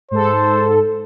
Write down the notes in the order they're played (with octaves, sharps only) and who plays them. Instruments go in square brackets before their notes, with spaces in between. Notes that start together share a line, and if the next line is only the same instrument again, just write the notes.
[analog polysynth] G#2 A4 [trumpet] C5